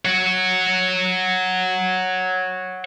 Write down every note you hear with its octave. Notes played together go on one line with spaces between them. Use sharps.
C#5 F#5